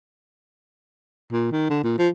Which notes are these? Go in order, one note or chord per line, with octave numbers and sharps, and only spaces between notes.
A#2
D#3
D3
A#2
F3